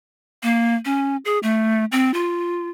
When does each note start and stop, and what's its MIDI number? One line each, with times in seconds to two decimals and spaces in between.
0.43 0.75 58
0.85 1.17 61
1.25 1.39 68
1.43 1.85 57
1.92 2.13 60
2.14 2.69 65